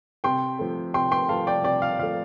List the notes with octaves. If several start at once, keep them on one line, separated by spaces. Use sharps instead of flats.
C3 G5 C6
F3 A3
C3 G5 C6
G5 C6
F3 A3 F5 A5
D5 G5
C3 D5 G5
F5
F3 A3 F5